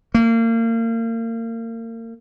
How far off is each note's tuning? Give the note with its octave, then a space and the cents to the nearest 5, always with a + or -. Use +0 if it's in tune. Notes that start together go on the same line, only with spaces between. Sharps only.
A#3 -35